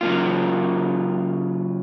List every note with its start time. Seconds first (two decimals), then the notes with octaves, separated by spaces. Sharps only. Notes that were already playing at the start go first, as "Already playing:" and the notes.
0.01 C#3 F#3 A#3 F4